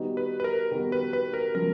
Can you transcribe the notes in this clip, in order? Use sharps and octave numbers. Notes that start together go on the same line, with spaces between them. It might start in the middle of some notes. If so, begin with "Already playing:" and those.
Already playing: D#3 G3 B3 D#4 F#4
B4
B4
A#4
D#3 G3 B3 D#4 F#4
B4
B4
A#4
C#3 F3 G#3 B3 A#4